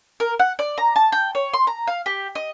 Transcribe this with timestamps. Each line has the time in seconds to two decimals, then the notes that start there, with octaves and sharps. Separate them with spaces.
0.20 A#4
0.40 F#5
0.59 D5
0.78 A#5
0.96 A5
1.12 G5
1.35 C#5
1.54 C6
1.67 A#5
1.87 F5
2.06 G4
2.35 D#5